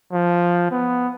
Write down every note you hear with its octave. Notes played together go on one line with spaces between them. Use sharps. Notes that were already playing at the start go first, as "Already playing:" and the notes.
F3
B3